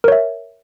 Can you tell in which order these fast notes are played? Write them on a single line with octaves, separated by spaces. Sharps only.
A#4 C#5 E5